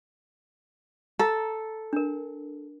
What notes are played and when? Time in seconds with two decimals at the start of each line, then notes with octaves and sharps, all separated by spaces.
1.19 A4 A#5
1.93 D4 A#4